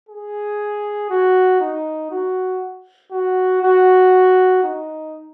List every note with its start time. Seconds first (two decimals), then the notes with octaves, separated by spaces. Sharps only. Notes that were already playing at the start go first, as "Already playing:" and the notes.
0.09 G#4
1.10 F#4
1.61 D#4
2.11 F#4
3.12 F#4
3.62 F#4
4.64 D#4